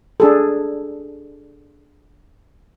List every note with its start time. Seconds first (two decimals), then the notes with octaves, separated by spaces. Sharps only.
0.20 D4 G#4 A4